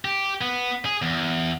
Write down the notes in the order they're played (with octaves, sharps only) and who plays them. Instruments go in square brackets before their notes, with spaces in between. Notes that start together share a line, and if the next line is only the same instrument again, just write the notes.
[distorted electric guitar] G4
B3
G#4
E2